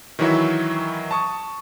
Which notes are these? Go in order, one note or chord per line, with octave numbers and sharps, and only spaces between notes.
D#3 E3 F#3 E4 F#4 E5
A5 C#6 D#6